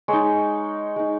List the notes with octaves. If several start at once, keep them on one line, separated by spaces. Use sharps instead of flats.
G#3 D#4 C#5
G#3 D#4